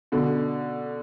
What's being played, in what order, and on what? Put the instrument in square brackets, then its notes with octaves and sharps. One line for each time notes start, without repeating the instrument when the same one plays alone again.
[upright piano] B2 D3